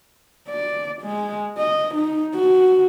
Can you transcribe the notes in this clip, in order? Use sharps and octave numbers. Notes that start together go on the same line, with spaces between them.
D5
G#3
D#5
D#4
F#4